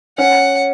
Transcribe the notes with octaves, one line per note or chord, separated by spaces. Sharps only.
C#4 F#5